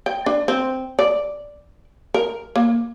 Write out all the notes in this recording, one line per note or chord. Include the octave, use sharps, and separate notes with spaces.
G5
D4
C4
D5
A#4
A#3